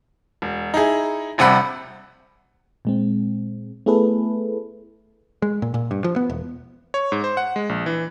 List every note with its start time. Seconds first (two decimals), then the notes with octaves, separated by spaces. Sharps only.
0.42 E1
0.74 D#4 E4 G#4
1.38 D#1 A#1 C3 G3 F#5 B5
2.85 A#2 G#3 C4
3.86 A3 B3 E4 G#4 A4 B4
5.42 G#3
5.62 A#2
5.74 A#2
5.91 G2
6.04 F3
6.16 B3
6.30 E1
6.94 C#5
7.12 G#2
7.24 C5
7.37 F#5
7.56 G#3
7.69 A#1
7.86 E3